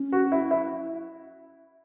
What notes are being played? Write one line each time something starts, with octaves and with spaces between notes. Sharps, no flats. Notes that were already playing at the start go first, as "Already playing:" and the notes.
Already playing: C#4
F#4
E4
E4